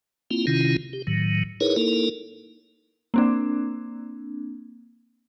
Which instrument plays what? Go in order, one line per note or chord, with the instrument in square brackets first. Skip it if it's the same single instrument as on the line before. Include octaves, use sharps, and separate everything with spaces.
[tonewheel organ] A#3 C4 E4 F4
C3 D#3 C#4 E4 F4
G4
A2 D#3 F#3
D#4 E4 G#4 A#4 B4 C#5
A#3 D#4 E4 A4 A#4
[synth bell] A#3 C4 D4